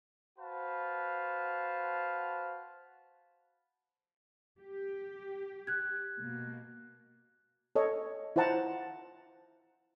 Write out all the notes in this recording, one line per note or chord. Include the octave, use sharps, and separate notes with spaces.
F#4 B4 C5 F5 A5
G4
F#6 G#6
B2 A#3
A4 C#5 D#5
E4 F4 C5 F#5 A5 A#5